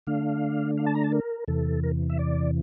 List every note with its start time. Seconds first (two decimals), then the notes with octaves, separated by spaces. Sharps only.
0.07 D3 A3 D4 F5
0.78 F5
0.86 A5
0.95 A#5
1.04 A5
1.12 A#4
1.48 E2 C3 E3 A4
1.83 A#4
2.10 E5
2.19 D5